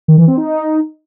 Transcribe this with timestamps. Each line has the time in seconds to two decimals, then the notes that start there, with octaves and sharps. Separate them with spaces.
0.08 D#3
0.18 E3
0.28 C4
0.37 D#4